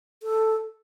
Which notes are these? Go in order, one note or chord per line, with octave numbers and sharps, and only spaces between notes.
A4